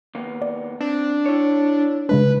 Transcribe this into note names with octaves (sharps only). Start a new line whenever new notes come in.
D#2 A#3 B3
D5
C4 D4
E4 C#5
C#3 G#3 D4 B4